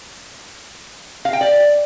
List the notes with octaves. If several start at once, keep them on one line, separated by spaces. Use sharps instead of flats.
F5
G5
D5